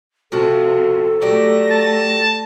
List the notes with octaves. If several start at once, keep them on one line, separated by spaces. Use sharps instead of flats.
C3 F3 F#4 A4 A5
F#3 A3 G4 D5 A#6
A5